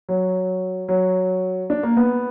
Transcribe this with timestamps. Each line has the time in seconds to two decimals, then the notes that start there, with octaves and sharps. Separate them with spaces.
0.09 F#3
0.89 F#3
1.70 D4
1.83 A#3
1.97 B3